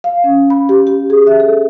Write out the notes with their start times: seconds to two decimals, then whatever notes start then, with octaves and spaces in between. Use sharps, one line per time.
0.04 F5
0.24 C#4
0.50 B5
0.69 G4
0.87 G4
1.10 G#4
1.27 E5
1.40 A4